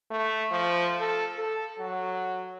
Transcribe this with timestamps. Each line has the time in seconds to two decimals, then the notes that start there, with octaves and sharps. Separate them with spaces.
0.10 A3
0.51 F3
1.00 A4
1.37 A4
1.79 F#3